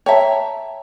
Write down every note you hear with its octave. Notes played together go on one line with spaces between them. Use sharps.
C#5 E5 G5 A5 A#5